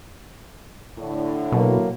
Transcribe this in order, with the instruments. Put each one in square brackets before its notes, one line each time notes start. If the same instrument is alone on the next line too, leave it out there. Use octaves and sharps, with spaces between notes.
[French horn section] A2 D3
[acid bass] B2 [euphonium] F#3 [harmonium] A#3